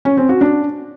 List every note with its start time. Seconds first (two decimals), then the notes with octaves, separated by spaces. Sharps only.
0.05 C#4
0.17 C4
0.29 F#4
0.41 D4